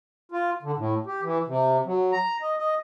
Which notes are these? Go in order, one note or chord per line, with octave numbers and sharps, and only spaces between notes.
F4
D3
A2
G4
E3
C3
F#3
A#5
D#5
D#5